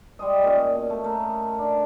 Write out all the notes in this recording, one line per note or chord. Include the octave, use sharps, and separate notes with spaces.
G3 G#3 D#5
A#2 C#4
B2
A3
A3 A#4
D4